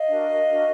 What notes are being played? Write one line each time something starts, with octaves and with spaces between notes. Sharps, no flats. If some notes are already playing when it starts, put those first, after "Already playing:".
Already playing: D#5 F5
D4 F#4 A#4
D4 F#4 A#4